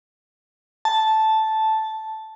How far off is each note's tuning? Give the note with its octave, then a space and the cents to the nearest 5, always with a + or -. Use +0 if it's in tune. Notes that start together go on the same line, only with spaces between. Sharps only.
A5 -5